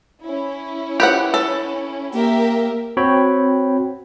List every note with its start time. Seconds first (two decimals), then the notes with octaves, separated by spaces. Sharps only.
0.23 C#4 E4
1.00 G4 B4 F#5
1.34 A4
2.13 A#3 G4 A#4 E5
2.97 C4 F#4 C#5 G5 B5